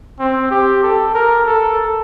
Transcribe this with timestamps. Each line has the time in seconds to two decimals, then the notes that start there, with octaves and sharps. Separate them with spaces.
0.19 C4
0.51 G4
0.83 A4
1.14 A#4
1.46 A4